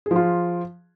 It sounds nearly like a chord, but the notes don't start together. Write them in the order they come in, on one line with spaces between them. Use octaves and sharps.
G#4 F3 F4